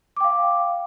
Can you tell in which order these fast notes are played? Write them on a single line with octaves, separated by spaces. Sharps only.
D6 G5 F5